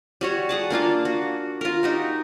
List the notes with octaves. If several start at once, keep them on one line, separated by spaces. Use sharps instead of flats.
G3 F#4 C#5
G#4 F#5 A5
A#3 D4 F4 F5
F#4
F4 A#4
D#4 F#4 G4